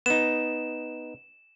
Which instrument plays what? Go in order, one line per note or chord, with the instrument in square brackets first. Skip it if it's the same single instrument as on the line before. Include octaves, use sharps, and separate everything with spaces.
[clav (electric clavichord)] B3 D#4 [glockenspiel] E7